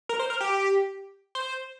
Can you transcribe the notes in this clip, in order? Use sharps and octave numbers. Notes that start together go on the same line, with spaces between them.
A#4
C5
A#4
G4
C5